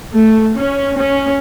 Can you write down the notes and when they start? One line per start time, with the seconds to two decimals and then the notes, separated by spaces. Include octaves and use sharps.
0.11 A3
0.56 C#4
0.94 C#4